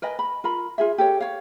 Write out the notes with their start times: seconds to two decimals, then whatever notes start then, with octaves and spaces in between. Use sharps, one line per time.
0.02 A#4 B4 D#5 G#5
0.19 B5
0.44 F4 A#4 B5
0.78 F4 G#4 E5
0.98 G4 A4 C#5
1.20 C#5 F5